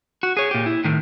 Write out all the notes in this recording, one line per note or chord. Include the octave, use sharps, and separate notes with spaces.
F#4
G#4 C#5
A#2 G4
E4
A2 D#3